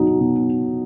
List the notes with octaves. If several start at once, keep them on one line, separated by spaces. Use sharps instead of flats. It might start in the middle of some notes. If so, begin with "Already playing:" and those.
Already playing: B2 F#3 D#4
B2